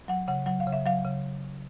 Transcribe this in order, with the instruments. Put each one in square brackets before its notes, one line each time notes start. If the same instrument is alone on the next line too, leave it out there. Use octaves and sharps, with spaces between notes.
[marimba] F#3 F#5
C#3 F#5
F#3 F#5
F5
C#3
E5
F#3 F5
C#3